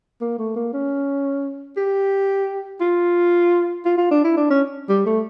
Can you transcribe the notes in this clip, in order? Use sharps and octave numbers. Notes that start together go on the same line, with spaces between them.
A#3
A3
A#3
C#4
G4
F4
F4
F4
D4
E4
D4
C#4
G3
A3